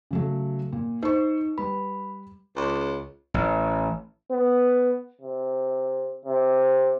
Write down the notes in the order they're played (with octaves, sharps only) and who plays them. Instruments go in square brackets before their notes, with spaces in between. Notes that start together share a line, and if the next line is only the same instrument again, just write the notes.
[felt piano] C#3 F#3 A3
A#2
[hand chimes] D#4 [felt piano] C5 C#6
[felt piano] G3 B4 [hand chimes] B5
[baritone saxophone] C#2
[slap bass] A1
[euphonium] B3
C3
C3